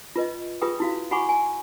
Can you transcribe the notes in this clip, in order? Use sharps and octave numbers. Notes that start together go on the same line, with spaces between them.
F4 B4 D#5
F4 G#4 B4 G5 D#6
E4 F#4 F5
F#4 F#5 G#5 B5 C#6 D6
G#5